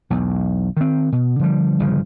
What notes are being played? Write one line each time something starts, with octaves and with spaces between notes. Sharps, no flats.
B1 E2
D#3 C4
B2
D3 F3 G3
G1 G2 C#3 F3